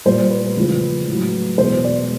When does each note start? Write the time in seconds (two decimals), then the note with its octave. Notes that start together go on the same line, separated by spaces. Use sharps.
0.06 A#2 G3 C5
0.30 B4
0.56 E2 C#3 F3 G#3
1.07 A2
1.12 F#3
1.58 E2 B2 G#3 C5
1.84 D5